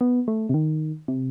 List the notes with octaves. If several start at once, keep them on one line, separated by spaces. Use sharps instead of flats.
B3
A3
C3
D#3
C3